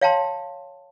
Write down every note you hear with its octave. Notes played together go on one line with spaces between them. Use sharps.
C#5 F5 G5 A5 C6